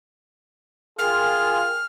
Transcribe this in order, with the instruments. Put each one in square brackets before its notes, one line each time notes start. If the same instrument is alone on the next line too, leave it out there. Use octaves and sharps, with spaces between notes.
[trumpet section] F4 [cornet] G#4 [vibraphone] A#4 G5 G#5 [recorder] F6